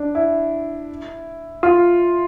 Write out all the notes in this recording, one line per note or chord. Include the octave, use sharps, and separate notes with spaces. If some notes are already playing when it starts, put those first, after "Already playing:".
Already playing: D4
E4
F4